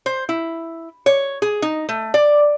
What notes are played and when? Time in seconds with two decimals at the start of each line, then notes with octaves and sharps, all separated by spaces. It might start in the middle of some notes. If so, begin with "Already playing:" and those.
0.06 C5
0.29 E4
1.06 C#5
1.42 G#4
1.62 D#4
1.89 A3
2.14 D5